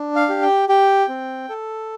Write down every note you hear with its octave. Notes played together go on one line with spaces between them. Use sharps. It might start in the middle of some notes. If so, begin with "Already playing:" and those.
Already playing: D4
F5
G4
G5
G4 G5
C4
A4